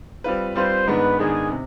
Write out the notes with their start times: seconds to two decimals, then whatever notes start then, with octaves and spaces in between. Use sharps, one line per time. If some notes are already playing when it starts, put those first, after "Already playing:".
0.24 G3 C4 F4 B4
0.55 G3 C4 F4 B4 C5
0.88 G#2 D#3 G#3 B3 D4 B4
1.19 G#2 D#3 G#3 B3 D4 G#4
1.50 C3